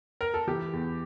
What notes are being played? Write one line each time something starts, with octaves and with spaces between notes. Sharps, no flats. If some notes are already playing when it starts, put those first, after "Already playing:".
A#4
A4
E3 G4
E2